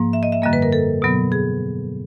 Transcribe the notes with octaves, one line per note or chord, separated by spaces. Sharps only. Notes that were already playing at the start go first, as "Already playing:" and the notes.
Already playing: G#2 F3 A#3
E5
D#5
E5
F#2 D3 G3 A#3 D#5
B4
A#4
A4
B2 F#3 B3
G#4